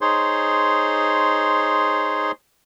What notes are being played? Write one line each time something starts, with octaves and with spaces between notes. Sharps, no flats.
D#4 G#4 C5 C#5 C6